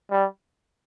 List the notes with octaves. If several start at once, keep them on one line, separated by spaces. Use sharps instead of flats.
G3